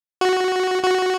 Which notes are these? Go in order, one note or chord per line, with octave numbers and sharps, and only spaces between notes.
F#4
F#4